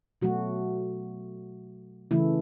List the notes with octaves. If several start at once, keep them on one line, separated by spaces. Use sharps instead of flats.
B2 F#3 A3 F#4
C#3 E3 A3 E4